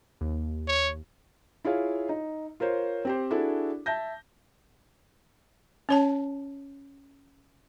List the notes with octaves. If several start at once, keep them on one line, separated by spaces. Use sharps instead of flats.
D#2
C#5
E4 F4 G#4 C#5 F5
D#4
F4 A#4 C5 C#5
C4 G4 C5
D4 E4 F#4 G#4 A4
E5 A5 G6 A#6
C#4 C#5 A5